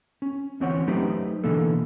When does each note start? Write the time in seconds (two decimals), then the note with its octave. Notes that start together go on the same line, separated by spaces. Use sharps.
0.22 C#4
0.60 D2 E3 C4 C#4 C#5 F#5
0.87 F#3 A3 D#4 G4 B4 C5
1.44 B2 D3 E3 A#3 A4